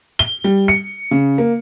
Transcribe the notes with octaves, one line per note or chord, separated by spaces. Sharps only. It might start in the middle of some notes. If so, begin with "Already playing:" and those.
G7
G3
C#7
C#3
A#3